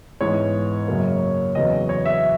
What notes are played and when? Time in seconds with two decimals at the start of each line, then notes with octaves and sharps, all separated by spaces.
0.21 G#2 E3 B3 C#5
0.88 F#2 C#3 F#3 A#3
1.55 E2 C#3 F#3 B3 D#5
1.89 C#5
2.06 E5